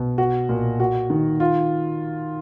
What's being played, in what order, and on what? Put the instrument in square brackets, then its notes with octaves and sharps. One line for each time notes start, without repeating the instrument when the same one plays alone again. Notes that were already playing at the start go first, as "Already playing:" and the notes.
Already playing: [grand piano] B2
F#4
A#2
F#4
D#3
F4